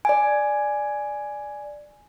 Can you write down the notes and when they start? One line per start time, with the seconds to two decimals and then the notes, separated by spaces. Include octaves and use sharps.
0.05 D5 G#5